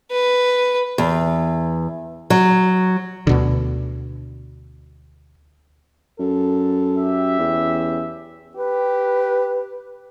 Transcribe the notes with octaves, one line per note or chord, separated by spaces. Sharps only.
B4
E2
F#3
D2 B2 D3
F#2 A4
G4 E5
E2 C#4
G4 B4